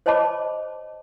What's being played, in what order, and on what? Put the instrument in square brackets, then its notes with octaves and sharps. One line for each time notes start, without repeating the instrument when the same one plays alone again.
[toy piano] C5 C#5 D#5 A5 B5 D6